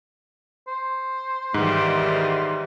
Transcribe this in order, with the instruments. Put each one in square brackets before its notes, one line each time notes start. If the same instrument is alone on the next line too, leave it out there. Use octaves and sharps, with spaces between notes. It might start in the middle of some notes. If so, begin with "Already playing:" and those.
[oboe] C5
[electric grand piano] G#2 [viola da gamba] D#3 E3 G3